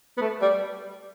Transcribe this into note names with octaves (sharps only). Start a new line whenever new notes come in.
B3
A3
G3